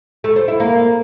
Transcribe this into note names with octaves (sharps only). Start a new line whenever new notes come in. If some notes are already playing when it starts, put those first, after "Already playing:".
A3
C5
E4
A#3